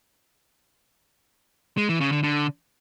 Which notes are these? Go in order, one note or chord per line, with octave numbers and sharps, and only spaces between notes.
G#3
E3
C#3
D3
D3